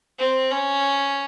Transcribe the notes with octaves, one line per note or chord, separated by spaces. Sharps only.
C4
C#4